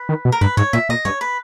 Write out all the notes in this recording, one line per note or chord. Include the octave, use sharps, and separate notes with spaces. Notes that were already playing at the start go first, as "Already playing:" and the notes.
Already playing: B4
D#3
B2
A#4
G2 B4
G#2 C#5
A#2 E5
A#2 D#5
G2 C#5
B4